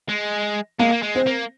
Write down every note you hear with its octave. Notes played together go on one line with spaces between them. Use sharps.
G#3
G#3 A#3
A#3
G#3
C4
A#3